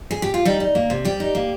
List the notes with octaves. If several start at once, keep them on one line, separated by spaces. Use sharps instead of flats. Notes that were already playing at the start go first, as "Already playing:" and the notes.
G#4
G4
F4
G3 D#4
D#4
A#3
C3
G3 G4
D#4
A#3